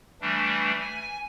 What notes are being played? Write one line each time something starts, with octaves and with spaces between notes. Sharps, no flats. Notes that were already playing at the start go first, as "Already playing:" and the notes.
E3 G3 A3 D4
G#5